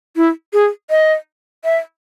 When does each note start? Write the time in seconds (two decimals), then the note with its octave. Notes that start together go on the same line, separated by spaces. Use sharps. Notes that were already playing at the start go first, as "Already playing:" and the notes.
0.16 E4
0.53 G#4
0.90 D#5
1.64 E5